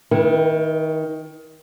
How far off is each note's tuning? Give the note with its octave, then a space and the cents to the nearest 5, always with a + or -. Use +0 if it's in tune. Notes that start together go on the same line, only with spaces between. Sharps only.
D#3 +20 E4 +0 B4 -25